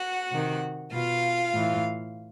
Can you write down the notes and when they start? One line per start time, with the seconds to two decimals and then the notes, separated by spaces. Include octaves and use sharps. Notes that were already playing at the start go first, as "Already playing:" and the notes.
Already playing: F#4 F#5
0.32 C3 D#3
0.92 B2 F4 F5
1.54 A2 E3